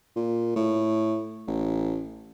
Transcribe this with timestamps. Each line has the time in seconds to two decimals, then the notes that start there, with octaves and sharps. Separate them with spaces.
0.16 A#2
0.55 A2
1.47 A1